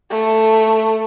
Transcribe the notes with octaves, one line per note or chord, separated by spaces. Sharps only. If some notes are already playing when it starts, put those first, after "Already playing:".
A3